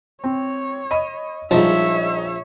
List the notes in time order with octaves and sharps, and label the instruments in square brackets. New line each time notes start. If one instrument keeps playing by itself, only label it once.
[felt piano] C4 [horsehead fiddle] C#5
[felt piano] D#5 B5 D#7
[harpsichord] A#1 F3 A5 [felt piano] G3 G#3 D#4 [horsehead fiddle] C#5 E5